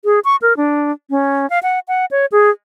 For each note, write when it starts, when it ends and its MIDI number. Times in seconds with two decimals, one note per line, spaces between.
0.05 0.20 68
0.25 0.36 85
0.42 0.56 70
0.57 0.92 62
1.10 1.49 61
1.50 1.59 77
1.63 1.79 78
1.88 2.05 78
2.11 2.26 73
2.32 2.50 68